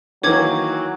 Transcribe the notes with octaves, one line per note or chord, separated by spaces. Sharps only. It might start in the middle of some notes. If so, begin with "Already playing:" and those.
D#3 E3 F#3 A#3 C#5 D6 G#6